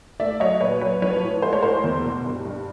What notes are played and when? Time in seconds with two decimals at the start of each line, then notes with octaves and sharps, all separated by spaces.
0.20 A3 D5 E5
0.40 F#3 C#5 D#5
0.61 A#2 B4 C#5
0.81 F#3 B4 C#5
1.02 F3 B4 C#5
1.23 A2
1.42 G#3 C5
1.53 C#5
1.63 A2 A#4 C5
1.84 E2
2.04 B2
2.25 G2
2.45 G2